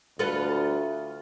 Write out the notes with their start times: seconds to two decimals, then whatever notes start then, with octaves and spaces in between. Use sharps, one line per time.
0.19 D2 F4 A4 B4